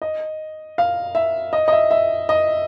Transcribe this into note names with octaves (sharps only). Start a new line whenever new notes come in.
D#5
F5
E5
D#5
D#5
E5
E5
D#5